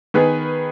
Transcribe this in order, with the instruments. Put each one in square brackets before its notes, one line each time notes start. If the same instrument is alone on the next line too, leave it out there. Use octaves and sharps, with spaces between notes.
[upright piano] D#3 B3 G#4 B4